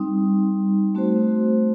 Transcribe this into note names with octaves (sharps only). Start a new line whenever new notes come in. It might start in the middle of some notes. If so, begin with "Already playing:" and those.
Already playing: G3 C4 D#4
A3 C4 F#4 C5